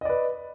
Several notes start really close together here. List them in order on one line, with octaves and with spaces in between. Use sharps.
D#5 D5 B4